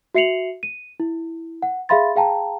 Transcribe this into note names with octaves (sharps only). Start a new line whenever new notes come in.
F#4 E5 C7 C#7 F7 F#7
D#7
E4
F#5
G#4 E5 F5 B5 C6 A6
G#4 F5 G5 A5 A#5